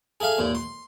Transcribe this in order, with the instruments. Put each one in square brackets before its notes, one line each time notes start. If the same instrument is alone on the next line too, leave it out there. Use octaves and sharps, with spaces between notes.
[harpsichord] G#4 A4 E5 F5
D#2 A#2
C6